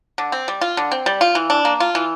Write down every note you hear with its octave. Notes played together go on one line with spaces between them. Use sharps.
D3
C4
G3
F4
D3
C4
G3
F4
E3
D4
A#3
F4
E3